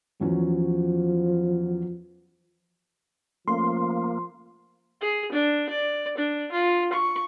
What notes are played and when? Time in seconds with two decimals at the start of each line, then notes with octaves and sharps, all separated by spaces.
0.21 E2 F3 F#3 C#4
3.48 F3 A3 A#3 C#4 C6
5.01 G#4
5.32 D4
5.69 D5
6.17 D4
6.52 F4
6.93 C#6